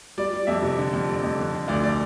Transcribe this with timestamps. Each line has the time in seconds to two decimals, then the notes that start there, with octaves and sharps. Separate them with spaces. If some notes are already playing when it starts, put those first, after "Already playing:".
0.18 G3 D5
0.32 G3
0.47 F2 E5
0.62 C3
0.78 D3
0.93 F2
1.08 G3 D5
1.23 F2
1.39 D3
1.53 D3
1.68 D2 D5
1.84 D5